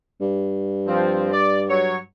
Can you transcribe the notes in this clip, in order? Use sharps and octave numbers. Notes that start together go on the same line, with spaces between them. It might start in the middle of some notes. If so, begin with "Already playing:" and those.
G2
F3 C4
D5
F#3 C#5